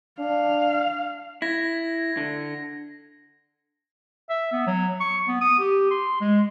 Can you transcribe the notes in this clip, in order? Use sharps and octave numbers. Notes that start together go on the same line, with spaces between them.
D4 F5
E4 G#6 A#6
D3
E5
B3
F#3
C#6
B3
D#6
G4
C6
G#3